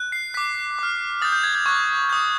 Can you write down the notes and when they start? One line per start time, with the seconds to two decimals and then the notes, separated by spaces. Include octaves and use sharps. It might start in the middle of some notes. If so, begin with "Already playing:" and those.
Already playing: F#6
0.12 C7
0.34 D6 F#6 B6
0.79 D6 F6
1.22 D#6 G6 A6
1.32 G6
1.43 G#6
1.55 G6
1.66 C#6 F#6 G#6
2.09 D#6 G6